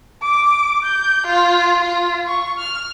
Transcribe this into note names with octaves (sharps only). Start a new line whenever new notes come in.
D6
G6
F4
F4
C#6
F6